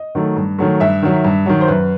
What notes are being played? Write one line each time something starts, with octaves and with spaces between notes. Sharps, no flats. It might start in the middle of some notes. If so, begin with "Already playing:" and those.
Already playing: D#5
D#3 F#3 A3
G2
D#3 F#3 A3
G2 E5
D#3 F#3
G2
D#3 F#3
C5
F#2 B4